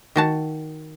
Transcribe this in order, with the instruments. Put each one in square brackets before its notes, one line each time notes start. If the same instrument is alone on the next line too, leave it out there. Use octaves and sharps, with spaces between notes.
[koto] D#3 F#4 A5